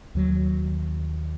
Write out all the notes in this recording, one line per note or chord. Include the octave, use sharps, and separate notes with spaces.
D#2 D#3 F#3